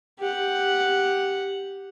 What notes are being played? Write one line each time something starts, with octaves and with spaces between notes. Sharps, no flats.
G4 F#5